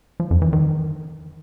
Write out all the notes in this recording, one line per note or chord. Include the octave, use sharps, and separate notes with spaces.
F3
F2
E3
D#3